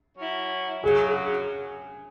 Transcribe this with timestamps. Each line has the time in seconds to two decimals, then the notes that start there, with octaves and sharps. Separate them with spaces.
0.16 F#3 C#4 E4
0.83 F#2 C#3 F#3 G#4